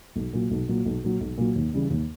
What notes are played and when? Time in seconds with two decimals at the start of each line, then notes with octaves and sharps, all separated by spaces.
0.16 B1
0.33 A#2 F#3
0.51 B1
0.69 A#2 F#3
0.86 B1
1.04 A#2 F#3
1.21 B1
1.38 A#2 F#3
1.56 D#2
1.73 C#3 E3 G3
1.90 D#2